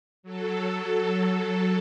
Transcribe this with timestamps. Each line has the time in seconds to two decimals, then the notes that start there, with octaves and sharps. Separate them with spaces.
0.23 F#3 A4